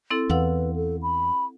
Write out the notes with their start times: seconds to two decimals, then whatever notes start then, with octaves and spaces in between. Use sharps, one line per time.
0.10 C4 E4 A4
0.30 E2 B4 F5 F#5 E6
0.76 A4
1.03 B5